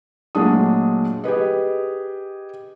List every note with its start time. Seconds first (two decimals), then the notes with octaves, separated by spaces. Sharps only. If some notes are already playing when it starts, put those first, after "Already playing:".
0.35 A#2 F#3 G#3 A3 D4 D#6
1.24 G4 G#4 B4 D#5